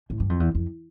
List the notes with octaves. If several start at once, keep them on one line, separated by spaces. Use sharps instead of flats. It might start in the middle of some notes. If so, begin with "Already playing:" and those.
A2
G2
F2
E2
F2